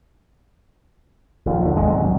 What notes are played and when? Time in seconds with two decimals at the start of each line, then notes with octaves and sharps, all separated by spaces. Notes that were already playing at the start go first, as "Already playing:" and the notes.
1.46 A#1 D#2 A#2
1.62 D#2 D3
1.77 G#1 E2 G#3
1.89 D#2 G#2 F#3 C4
2.04 A#1